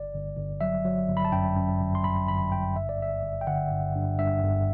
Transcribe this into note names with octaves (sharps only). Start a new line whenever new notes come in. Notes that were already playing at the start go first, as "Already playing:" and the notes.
Already playing: G1 D5
G1
G1
F#3 E5
F#3
G1
B5
A5
F#2 G5
F#2
G1
C6
G1 B5
G1 B5
G1 G5
G2 E5
D5
G1 E5
G1
G5
D3 F#5
G2
G2
G2 E5
G1